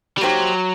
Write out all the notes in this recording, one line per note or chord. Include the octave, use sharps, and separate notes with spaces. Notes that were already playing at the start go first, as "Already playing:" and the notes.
G3
F#3 A#3 D#4 G4 C5